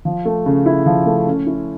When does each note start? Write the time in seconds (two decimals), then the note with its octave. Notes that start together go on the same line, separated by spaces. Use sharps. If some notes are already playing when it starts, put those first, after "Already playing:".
0.05 F3
0.25 A3
0.46 C#3
0.66 E4
0.86 F3
1.06 A3
1.26 C#4
1.47 E4